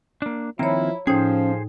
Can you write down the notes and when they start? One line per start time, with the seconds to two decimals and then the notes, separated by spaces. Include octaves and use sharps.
0.22 A#3 D4
0.59 D#3 F3 A#3 C4 E4 C#5 A#5
1.07 A2 F3 C#4 D#4 G#4 C5 G5